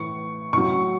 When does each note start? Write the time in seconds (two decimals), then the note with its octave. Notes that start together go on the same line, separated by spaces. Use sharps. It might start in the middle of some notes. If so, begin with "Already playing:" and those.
Already playing: A2 E3 C#6
0.53 A2 F#3 C#6